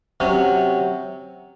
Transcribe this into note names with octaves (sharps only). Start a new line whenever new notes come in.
C3 F#3 C#4